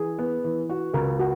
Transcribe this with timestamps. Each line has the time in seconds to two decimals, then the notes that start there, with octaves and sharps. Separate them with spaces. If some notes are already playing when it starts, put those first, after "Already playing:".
Already playing: E3 G#4
0.18 B3
0.44 E3
0.69 F#4
0.94 C#2 A#4
1.19 F#4